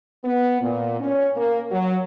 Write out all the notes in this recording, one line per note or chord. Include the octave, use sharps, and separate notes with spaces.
B3
A#2
C#4
A#3
F#3